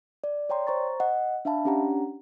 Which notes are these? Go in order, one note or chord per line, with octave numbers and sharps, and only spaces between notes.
D5
C#5 D5 G5 A#5 C6
C5 A#5 C#6 A6
D#5 F#5
D4 E5 F5 A5 B5
C#4 D4 G4 F#5 A#5